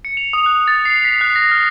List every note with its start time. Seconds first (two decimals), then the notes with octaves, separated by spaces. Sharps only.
0.05 C#7
0.17 F7
0.33 D#6
0.46 F#6
0.68 A6
0.85 C7
1.05 B6
1.21 F#6
1.36 A#6
1.51 F6